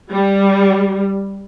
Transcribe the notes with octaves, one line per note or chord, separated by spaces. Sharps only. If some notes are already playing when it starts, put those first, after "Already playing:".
G3